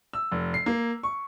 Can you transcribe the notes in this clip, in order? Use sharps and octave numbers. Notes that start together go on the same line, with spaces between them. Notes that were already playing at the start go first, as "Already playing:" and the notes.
E6
F1
C7
A#3
C#6